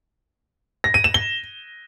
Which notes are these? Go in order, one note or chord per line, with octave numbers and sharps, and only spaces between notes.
A#6
D#7
E7
G7